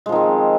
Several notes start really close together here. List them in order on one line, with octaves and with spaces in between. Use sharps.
G#3 F3 D#3 C4